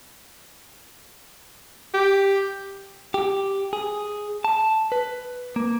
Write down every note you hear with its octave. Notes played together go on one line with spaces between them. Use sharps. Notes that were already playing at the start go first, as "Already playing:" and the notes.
G4
G4
G#4
A5
B4
A#3